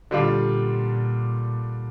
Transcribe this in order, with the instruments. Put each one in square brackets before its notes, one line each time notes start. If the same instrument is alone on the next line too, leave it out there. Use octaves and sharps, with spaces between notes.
[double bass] A#2 [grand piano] D3 G3 D4 F4